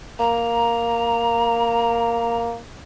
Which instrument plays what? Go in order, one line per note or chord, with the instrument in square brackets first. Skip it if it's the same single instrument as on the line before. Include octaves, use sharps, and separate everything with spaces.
[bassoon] A#3 [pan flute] A#5